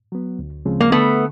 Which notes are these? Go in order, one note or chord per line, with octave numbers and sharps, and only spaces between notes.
F#3 B3
D2
C#3 F3 G#3 C4
A#3
D3 A3 B3